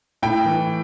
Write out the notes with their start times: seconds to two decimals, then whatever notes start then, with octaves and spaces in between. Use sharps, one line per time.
0.23 A2 G5
0.46 E3